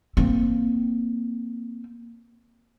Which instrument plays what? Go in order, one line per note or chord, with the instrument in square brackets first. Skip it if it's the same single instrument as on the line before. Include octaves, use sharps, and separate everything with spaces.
[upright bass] A#3 C4